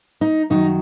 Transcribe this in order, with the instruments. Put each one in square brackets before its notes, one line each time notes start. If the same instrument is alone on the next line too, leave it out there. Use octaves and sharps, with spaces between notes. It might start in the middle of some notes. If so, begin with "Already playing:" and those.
[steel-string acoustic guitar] D#4
F#2 D#3 F#3 D#4